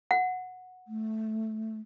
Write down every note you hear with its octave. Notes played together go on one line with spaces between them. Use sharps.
F#5
A3